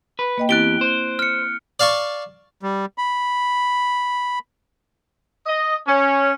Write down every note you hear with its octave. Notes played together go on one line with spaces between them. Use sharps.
B4
A#3 D#5 G5
E2 C4 E4 G4 F#6 A6 D7 G7
C5
F6 C#7
D5 F5 A5 C#6
G3
B5
D#5
C#4